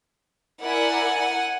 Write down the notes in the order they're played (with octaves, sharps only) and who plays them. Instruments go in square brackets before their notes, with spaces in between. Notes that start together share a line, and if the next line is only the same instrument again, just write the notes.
[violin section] E4 A#4 D5 [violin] F#5 G#5